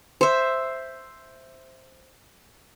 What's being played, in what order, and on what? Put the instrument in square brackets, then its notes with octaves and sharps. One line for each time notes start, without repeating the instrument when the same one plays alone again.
[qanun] C5 E5